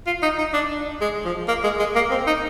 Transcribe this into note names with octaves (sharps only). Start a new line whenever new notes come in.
F4
D#4
D#4
D4
G#3
F3
A#3
G#3
G#3
A#3
C4
D#4